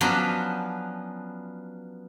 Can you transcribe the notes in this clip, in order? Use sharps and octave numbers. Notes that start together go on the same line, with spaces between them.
F3 F#3 B3 C#4 D4 F4